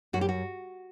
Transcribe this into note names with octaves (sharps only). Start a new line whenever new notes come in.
F#2 F#4
G4
F#4